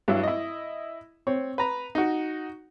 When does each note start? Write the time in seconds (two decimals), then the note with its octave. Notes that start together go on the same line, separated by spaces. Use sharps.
0.08 G2 F#3 E4
0.23 E4 D#5
1.27 C4 C#5
1.58 B4 A#5
1.95 D#4 F#4